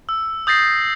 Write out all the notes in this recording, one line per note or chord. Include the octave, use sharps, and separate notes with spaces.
E6
D#6 G6 A6 A#6 C7